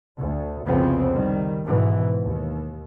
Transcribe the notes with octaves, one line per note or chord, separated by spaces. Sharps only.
D2
C2 F2 C#3 F3 B3 C4
D#3 G3
G#2 B2 E3
D#2